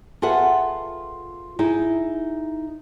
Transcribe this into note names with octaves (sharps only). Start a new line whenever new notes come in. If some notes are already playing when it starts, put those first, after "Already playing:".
F4 G#4 A4 B4 E5 F#5
D#4 E4 G#4